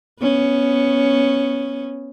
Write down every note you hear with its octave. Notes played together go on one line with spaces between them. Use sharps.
B3 C#4